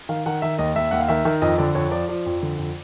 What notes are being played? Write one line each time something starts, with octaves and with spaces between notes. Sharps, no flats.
D#3 F5
D#3 F#5
D#3 E5
D#2 D#5
D#2 E5
D#2 F#5
F5
D#3 E5
D#3
F2 D#5
D3 D5
F2 C#5
F3 D5
F3 D5
F2
D3
F2